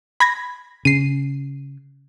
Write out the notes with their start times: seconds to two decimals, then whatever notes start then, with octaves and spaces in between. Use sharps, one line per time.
0.20 B5 G#6 A#6
0.85 C#3 C7 D#7